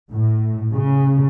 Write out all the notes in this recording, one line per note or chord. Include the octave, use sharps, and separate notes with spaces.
A2
C#3